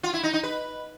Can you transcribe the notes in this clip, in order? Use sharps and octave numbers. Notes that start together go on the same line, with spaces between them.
F4
E4
D#4
D#4
B4